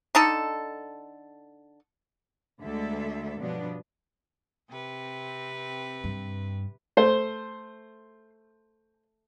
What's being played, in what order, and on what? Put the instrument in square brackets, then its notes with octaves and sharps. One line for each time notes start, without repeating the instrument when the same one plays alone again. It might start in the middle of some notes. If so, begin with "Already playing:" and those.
[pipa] D3 D#4 A4
[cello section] D2 D3 G#3 A4 E5
G2 B2 F3 F#3 B3 D4
[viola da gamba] C3 C4 B4
[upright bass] G2
[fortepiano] A3 C5